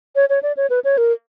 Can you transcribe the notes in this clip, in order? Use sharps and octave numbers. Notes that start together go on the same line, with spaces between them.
C#5
C#5
D5
C#5
B4
C#5
A#4